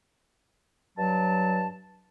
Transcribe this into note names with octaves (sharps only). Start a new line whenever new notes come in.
G2 F#3 A5